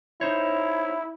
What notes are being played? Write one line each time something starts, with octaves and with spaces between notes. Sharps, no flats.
D#4 E4 C5 C#5